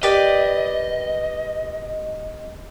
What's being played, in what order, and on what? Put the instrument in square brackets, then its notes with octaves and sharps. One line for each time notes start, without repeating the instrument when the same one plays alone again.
[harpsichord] G4 A#4 [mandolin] B4 D5 G5 [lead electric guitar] D#5